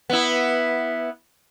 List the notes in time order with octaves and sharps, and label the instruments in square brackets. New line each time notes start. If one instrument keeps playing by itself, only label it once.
[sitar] B3 E4